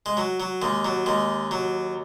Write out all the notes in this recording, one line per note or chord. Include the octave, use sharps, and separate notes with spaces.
G#3
F#3
F#3
D#2 G#3
F#3
D#2 G#3
F#3